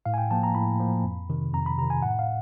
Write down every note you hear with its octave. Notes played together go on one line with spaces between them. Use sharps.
A2 F5
G#5
G5
F3 A#3 A5
A#5
A2 B5
F3 A#3
F2
C3 D#3
F2 A#5
B5
C3 D#3 A#5
G#5
A2 F#5
F5